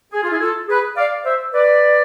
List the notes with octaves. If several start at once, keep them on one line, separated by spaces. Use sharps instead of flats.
G#4
F4
E4 G#4
F4 A4
G#4 B4
D5 F5
C5 E5
B4 D5